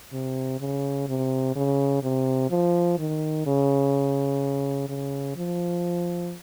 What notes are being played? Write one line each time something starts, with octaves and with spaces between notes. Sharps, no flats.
C3
C#3
C3
C#3
C3
F3
D#3
C#3
C#3
F3